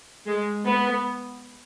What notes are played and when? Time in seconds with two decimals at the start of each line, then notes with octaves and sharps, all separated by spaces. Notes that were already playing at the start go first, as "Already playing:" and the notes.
0.26 G#3
0.65 B3